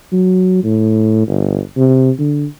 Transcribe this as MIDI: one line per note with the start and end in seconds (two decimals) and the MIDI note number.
0.12 0.60 54
0.64 1.26 45
1.28 1.59 31
1.77 2.11 48
2.19 2.45 50